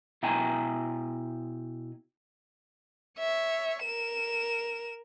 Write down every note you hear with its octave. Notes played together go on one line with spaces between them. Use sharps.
B2 E4 G5 G#5 A#5
C#5 E5
A#4 E7